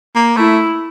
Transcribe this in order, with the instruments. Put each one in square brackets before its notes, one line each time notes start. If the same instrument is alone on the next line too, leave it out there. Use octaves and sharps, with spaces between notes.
[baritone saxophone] A#3
[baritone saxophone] A3 [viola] E4